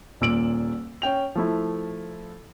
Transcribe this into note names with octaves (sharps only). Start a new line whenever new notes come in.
D#1 A#2 E6 D7 F#7
C#4 G5 F7
F3 A3 E4